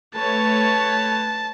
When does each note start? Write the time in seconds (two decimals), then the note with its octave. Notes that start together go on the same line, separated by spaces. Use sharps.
0.15 A3 B4 C#5 A5